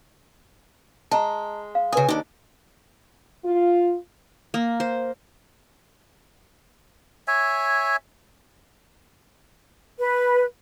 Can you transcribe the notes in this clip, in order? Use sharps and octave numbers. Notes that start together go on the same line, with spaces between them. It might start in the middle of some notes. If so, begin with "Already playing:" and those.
G#3 A5 A#5
F5
C#3 B4 G#5 D#6
D#2 D4 D#4
F4
A#3
C5
C#5 E5 G#5
B4